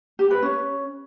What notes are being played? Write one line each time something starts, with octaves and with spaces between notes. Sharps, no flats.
G4
B4
C#4